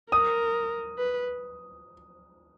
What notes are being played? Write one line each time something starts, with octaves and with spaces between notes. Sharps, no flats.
A#4 D#6
B4